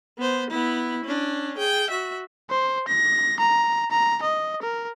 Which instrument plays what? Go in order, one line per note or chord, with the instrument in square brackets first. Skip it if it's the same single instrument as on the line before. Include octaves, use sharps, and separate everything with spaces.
[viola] B3 C5
B3 E4
C#4 D4
G#4 G5
F#4 E5
[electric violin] C5
A#6
A#5
A#5
D#5
A#4